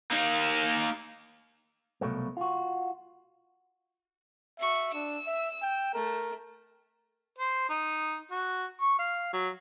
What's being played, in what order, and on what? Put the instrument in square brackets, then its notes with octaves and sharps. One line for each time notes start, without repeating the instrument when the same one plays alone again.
[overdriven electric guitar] A#3 D#4
[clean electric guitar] C2 B2 F#3 A3 A#3
F4 F#4
[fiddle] F#4 C#6 [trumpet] E5
[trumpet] D4 [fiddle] E6
[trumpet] E5
G5
[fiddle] A3 [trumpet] A#4
[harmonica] C5
D#4
F#4
C#6
F5
F#3